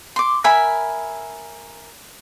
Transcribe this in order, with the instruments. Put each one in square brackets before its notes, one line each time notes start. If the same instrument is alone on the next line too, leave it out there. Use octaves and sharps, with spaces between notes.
[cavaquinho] C6 D6
A#4 E5 G#5 B5